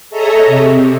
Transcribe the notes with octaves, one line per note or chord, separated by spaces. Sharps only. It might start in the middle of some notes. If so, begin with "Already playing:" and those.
G#4 A4 C#5 D#5 E5 A#5
C3